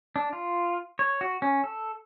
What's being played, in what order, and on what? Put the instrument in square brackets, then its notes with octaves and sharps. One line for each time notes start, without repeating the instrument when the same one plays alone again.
[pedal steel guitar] D4
F4
C#5
F#4
C#4
A4